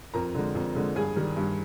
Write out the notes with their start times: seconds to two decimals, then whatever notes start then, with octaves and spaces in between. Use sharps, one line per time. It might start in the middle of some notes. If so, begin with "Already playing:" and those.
0.13 F2 A#4 A#5
0.35 D3 G#3
0.55 F2
0.75 D3 G#3
0.95 G2 G#4 G#5
1.16 D#3 G3
1.36 G2